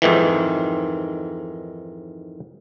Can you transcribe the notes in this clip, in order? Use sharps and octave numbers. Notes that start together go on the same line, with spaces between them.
F2 G#2 D#3 E3